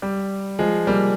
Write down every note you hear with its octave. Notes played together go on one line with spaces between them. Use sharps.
G3
F3 G#3
G3 A#3